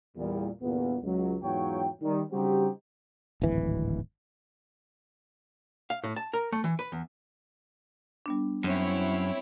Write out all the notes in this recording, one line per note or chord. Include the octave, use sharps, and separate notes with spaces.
E2 A#2 G3
G1 E2 A#2 B3
C#2 F#3
E2 G#2 F#3 F4 C#5 G5
D#3 G3
C#3 G3 C4 D#4 F#4 G4
D1 G#1 E3
F5
A2
A5
A#4
A3
E3
B4
E2
G3 B3 D4
F#2 C4 E4 C#5